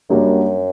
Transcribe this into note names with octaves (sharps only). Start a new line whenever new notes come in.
F#2 G3 A#3 D4 F#4